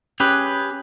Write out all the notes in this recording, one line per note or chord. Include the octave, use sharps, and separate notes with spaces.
C#4 G4 G#4 B4